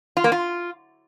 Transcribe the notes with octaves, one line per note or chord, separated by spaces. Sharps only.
F4
A#3
F4